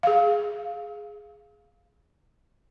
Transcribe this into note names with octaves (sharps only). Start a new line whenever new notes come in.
G#4 F5